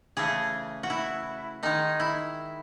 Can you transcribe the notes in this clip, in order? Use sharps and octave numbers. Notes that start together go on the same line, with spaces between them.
C#3 E3 A3 G#4
F#4
E4
D#3 G#3 D#4
E4